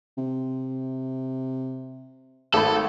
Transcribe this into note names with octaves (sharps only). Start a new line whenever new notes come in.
C3
G#1 A3 A4 B5